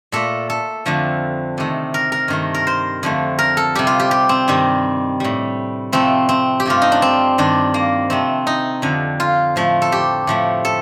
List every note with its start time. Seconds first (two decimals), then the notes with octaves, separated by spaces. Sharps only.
0.12 A#2 A3 A4
0.50 A4
0.86 F2 D3 F3 A3
1.58 C3 D#3 A3
1.94 A#4
2.12 A#4
2.28 G2 D#3 A3
2.54 A#4
2.67 C5
3.03 F2 D3 F3 A3
3.39 A#4
3.57 A4
3.75 C3 G3 G4
3.87 F4
4.00 G4
4.11 G4
4.29 C4
4.48 G2 D#3 G3
5.20 A2 G3
5.92 C3 F3 A3 C4
6.29 C4
6.60 G4
6.66 G2 F3 A3 F4
6.82 D#4
6.92 D4
7.02 C4
7.38 G2 D#3 G3 D4
7.74 A#3
8.10 C3 F3 A3 C4
8.47 D#4
8.82 F2 D3 F3
9.20 F4
9.56 A2 F3 A3
9.82 A4
9.92 G4
10.27 A2 F3 A3
10.65 A4